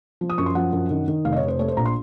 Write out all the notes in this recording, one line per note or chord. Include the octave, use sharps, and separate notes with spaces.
F3
D#6
F#2 C#6
C6
F3 F#5
F#2
D#3
D#3
F1 F5
D#5
C#5
F1
C5
A3 C#5
C5
A#1 A#5
C6